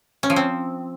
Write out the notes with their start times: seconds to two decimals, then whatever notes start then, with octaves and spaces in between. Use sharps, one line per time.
0.23 C#4
0.30 F3
0.36 C4